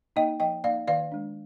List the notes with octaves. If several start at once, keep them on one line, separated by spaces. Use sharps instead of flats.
A#3 D#4 D#5 G5
F3 D#5 G5
A#3 D#4 D5 F5
D#3 D5 F5
G#3 D4